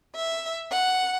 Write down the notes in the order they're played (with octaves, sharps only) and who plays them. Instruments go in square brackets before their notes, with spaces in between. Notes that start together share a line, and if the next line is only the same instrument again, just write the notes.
[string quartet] E5
F#5